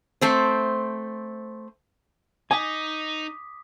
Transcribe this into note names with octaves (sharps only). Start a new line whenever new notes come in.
A3 C4 C5
D#4 G#5 D6 D#6 B6